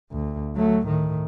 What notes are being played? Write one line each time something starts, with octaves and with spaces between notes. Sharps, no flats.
D2
F#3 A3
A2 D#3